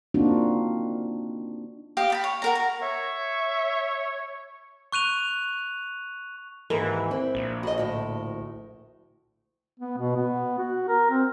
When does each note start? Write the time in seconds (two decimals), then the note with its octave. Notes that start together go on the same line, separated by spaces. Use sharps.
0.14 A#3 C4 D4 D#4 F4 F#4
1.97 G4 D#5 F5
2.10 B4 A5 B5
2.24 C#5
2.42 F#4 A#4 A#5
2.55 A#5
2.82 C#5 E5
4.92 C#6 F#6 D#7 F7
6.70 D#2 G#2 E3 A#4
7.10 C4 E4
7.35 A#1
7.63 F#4 D#5
7.78 D2 A2
9.79 B3
9.98 B2
10.17 B3
10.59 F#4
10.88 A#4
11.10 C4